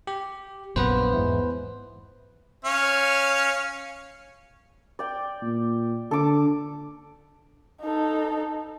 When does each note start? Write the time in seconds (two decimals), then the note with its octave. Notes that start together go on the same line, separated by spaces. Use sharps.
0.07 G4
0.76 A#1 F#2 B3 B4 C5
1.13 E2 G#2
2.65 C#4 C#5 F5
4.99 D5 G5
5.42 A#2
6.11 D3 A4 D6
7.81 D#4 A4